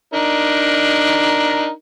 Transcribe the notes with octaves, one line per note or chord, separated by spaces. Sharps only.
D4 D#4 A#4